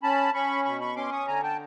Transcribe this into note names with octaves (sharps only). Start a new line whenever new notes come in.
C#4 A5 B5
C#4 B5 C#6
B2 B5 C#6
B5 C#6
C#4 C6 D6
C#6 D#6
D3 G#5 A#5
G5 A5